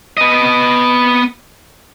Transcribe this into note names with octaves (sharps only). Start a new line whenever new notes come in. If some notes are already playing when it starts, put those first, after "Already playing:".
B3 D#5